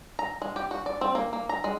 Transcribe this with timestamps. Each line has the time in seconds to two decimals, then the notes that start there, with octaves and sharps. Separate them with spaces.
0.19 A#5
0.42 G#3
0.56 G4
0.71 F#4
0.86 D5
1.01 C4
1.15 A#3
1.33 A#3
1.49 A#5
1.64 G#3